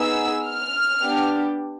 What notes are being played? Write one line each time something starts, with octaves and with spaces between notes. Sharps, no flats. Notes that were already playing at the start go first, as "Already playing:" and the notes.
Already playing: B3 D#4 G#4 E6
F6
B3 D4 G4